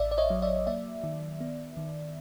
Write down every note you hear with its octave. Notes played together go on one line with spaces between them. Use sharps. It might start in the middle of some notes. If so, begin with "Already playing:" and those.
Already playing: A1 D5 E5
D5
C#5 D#5
F#3
D5 E5
A#3 D5 E5
D#3
B3
D#3